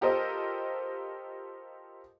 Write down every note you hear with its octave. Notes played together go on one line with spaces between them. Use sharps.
F4 G4 A4 A#4 C5 D#5